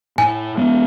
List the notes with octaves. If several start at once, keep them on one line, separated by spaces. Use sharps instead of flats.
A2 G#5
G#3 B3